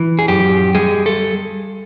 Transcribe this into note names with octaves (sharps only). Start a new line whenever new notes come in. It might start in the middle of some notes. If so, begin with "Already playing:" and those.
Already playing: E3
G#4
F#2 G4
G3 G#4
A4